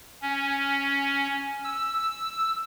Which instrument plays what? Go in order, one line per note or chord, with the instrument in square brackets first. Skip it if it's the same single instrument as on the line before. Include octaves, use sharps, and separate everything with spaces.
[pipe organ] C#4
E6